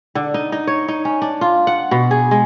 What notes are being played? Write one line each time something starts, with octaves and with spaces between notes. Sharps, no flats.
D3
D#4
D#4
C#5
D#4
C#4
D4
F4
F#5
B2
G#4
G#3